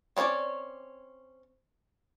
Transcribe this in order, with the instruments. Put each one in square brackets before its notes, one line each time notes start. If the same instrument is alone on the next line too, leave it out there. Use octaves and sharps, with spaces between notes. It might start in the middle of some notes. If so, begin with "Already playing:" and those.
[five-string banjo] C4 C#4 F4 C#5 D5